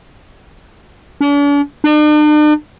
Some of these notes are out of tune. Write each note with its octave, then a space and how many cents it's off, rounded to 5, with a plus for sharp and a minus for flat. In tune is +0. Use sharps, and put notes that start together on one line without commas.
D4 -45
D4 +45